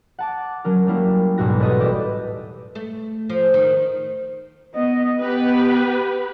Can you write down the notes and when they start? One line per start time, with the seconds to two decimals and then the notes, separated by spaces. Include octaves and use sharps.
0.19 F#5 A5 D6
0.65 F#3 C#4 A#4
0.87 G3 A#3 E4
1.38 A1 E2 G#2 B2 F#4 A#6
1.59 G4 A4 B4 C#5 D#5
1.79 F#4 G4 D5 E5
2.75 A3
3.30 F3
3.54 D#3
4.74 B3 D#5
5.21 B3 G4 B4